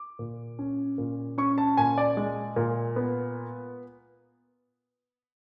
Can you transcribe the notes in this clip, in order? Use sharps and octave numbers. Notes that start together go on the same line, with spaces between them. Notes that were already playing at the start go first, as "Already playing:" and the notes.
Already playing: D6
A#2
C#4
A#2
C#4 C#6
A5
A#2 G#5
D5
G#3
A#2
B3